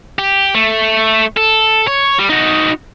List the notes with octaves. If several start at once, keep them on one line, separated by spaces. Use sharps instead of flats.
G4
A3
A4
C#5
G3
D#4 F#4